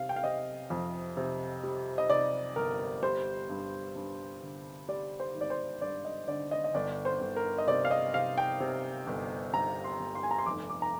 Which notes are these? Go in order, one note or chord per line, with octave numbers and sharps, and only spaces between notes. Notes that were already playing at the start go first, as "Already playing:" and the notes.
Already playing: C3 G3 F5
G5
F5
C3 D#5
F2
C3
G3
D#5
C3 D5
G1 A#4
G3 C5
G2
G2
D3
G3 D5
C5
G#1
D5
C5
G2 D5
D#5
D3 D5
D#5
D#5
G1 D5
C5
G1
A#4
D#5
C3 D5
F5
D#5
C3 F5
G5
C3
G1
G1 A#5
C6
G1
C6
G#5
A#5
C6
F1 D6
D6
A#5